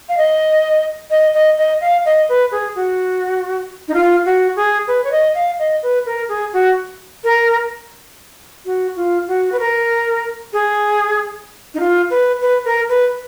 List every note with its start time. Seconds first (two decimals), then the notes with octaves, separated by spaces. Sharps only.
0.09 F5
0.17 D#5
1.10 D#5
1.34 D#5
1.58 D#5
1.81 F5
2.05 D#5
2.29 B4
2.52 G#4
2.76 F#4
3.88 D#4
3.94 F4
4.26 F#4
4.56 G#4
4.88 B4
5.04 C#5
5.12 D#5
5.35 F5
5.59 D#5
5.83 B4
6.06 A#4
6.29 G#4
6.53 F#4
7.24 A#4
8.65 F#4
8.96 F4
9.28 F#4
9.52 B4
9.59 A#4
10.53 G#4
11.74 D#4
11.80 F4
12.10 B4
12.42 B4
12.65 A#4
12.89 B4